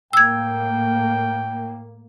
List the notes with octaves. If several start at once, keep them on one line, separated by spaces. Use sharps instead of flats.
A2 A#3 G5 E6 G#6